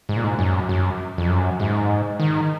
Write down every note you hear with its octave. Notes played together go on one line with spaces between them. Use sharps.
G#2
A#2
G#2
F#2
F#2
F2
F#2
G#2
D#3